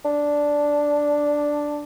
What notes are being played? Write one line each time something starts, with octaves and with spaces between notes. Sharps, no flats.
D4